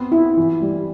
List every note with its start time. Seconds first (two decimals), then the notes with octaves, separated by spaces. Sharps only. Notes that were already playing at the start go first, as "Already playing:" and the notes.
Already playing: B3 C4
0.12 B3 E4
0.37 E3
0.62 G3